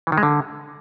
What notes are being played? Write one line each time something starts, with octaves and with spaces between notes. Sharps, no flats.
E3
D#3
G#3
D3